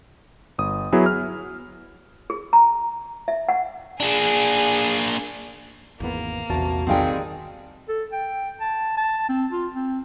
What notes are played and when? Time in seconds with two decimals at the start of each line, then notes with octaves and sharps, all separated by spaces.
0.58 G1 D#6
0.92 F#3 B3 E4 G#4
1.06 F6
2.30 G#4
2.53 A#5
3.28 E5
3.49 F#5
4.00 A#3 D4 G#4
6.00 G#1 E2 A#3 B3
6.50 A#1 E2 C3 F#4 A5
6.87 D#3 G3 G#3 C4 F5 G5
7.89 A4
8.13 G5
8.60 A5
8.97 A5
9.29 C4
9.51 F4
9.74 C4